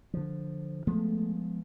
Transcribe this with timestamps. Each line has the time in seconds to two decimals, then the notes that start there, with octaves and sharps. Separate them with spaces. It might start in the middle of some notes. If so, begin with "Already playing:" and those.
0.14 D3 F3
0.87 F3 G#3 A3 B3